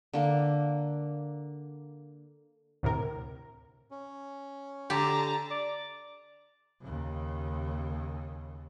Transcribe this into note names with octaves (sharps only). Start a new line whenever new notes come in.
D3 A#3
D2 A2 C3 A#4
C#4
D3 G4 A5 A#5
D5
D#2 C#3